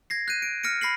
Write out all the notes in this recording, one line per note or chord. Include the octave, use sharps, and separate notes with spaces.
G#6 A#6 C7
F#6 G6 D#7
D7
F6 A#6 C#7 D7
B5 A#6 C7 F#7